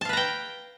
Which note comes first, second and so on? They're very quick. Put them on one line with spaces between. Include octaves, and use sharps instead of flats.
A5 F5 B4 A#5 G5